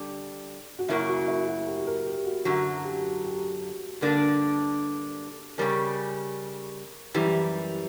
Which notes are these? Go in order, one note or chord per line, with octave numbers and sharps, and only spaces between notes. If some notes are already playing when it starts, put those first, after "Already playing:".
Already playing: D3 G3
F#4
F#2 C#3 F#3 A#3 E4
F#4
E4
F#4
G4
A#4
G4
F#4
F#2 D3 F#3 F#4
G4
G4
G2 D3 A#3 D4
C#3 G3 C#4 A#4
F#2 E3 G3 G4